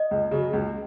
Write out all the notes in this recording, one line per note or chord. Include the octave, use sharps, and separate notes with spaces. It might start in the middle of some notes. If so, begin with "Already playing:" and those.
Already playing: D#5
C#2
C#3 F#3
C#2